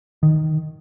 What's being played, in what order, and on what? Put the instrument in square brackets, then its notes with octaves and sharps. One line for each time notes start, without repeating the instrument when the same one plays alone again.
[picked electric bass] D#3